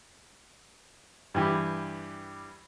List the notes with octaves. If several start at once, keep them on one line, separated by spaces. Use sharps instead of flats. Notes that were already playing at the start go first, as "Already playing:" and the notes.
G2 E3 G4